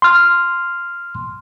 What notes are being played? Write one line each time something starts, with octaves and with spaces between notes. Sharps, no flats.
C6 F6